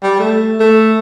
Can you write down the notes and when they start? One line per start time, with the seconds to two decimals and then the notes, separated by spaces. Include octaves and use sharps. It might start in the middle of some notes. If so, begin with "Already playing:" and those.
0.03 G3
0.20 A3
0.60 A3